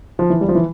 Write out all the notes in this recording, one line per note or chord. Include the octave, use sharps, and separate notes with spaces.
F3
E3
G3
F3
E3